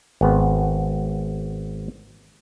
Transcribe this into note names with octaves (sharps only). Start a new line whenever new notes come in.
G#1 B3